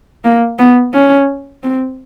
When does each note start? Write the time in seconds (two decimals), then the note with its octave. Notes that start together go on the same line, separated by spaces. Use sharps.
0.25 A#3
0.59 B3
0.94 C#4
1.63 C4